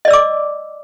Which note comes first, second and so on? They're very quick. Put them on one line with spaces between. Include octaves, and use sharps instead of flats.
D#5 D5 E6 D6